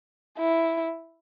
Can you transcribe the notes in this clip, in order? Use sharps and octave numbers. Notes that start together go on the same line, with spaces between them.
E4